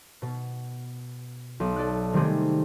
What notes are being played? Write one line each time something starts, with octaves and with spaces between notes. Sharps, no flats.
B2
B1
A4 D5 F#6
C3 D#3 G3 A3 C4 G#4